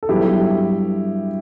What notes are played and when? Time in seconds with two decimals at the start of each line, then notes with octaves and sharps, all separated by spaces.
0.03 A4
0.09 G2 F#3 B3 E4 G4